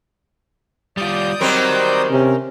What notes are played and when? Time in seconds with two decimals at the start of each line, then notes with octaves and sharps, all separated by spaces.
0.97 G3 F4 D5 D#6 G6
1.41 F#3 G3 C4 A#4 D#5
2.10 C3 C#4